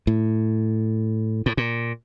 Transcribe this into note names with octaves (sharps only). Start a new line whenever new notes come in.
A2
A2
A#2